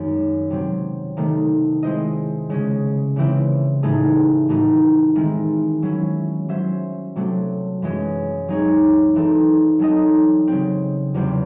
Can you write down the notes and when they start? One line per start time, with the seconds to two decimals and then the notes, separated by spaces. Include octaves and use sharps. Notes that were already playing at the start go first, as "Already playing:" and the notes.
Already playing: F#2 D#3 G#3
0.50 C3 F#3 C4
1.17 C3 D#3 A3
1.83 G#3 C4 E4 C5 D#5
2.50 C#3 G#3 C#4
3.16 C#3 E3 C4 E4
3.83 A2 E3 A3 D#4 G#4
4.49 A2 E3 A3 D#4 F#4
5.15 D#3 G#3 C4 E4
5.83 F#3 C#4 E4
6.49 F#3 C#4 F#4 C5 E5
7.16 C3 F#3 A3 C4 F#4
7.82 F#2 E3 G#3 C#4 F#4
8.48 F#3 C4 D#4 G#4 C#5
9.15 E3 C4 D#4 A4
9.79 F#3 C4 D#4 A4 D#5
10.48 C#3 F#3 C4
11.14 E2 C3 F#3 C4